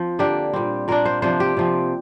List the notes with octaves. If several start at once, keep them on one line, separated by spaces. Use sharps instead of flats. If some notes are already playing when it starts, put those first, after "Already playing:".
Already playing: F3 C4
D3 A#3 D4 G4
A#2 G3 C4
A#2 A#3 D4 A#4
C5
C3 F3 A#3 D4 C5
G4
C3 F3 C4